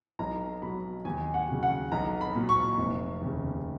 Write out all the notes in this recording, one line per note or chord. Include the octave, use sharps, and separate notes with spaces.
B1 A#5
B2 F#3 B5
D#2 G#5
F#5
C#3 F#3
F#5
B1 A#5
B5
A#2 F#3
C#6
F1
D#2 C#3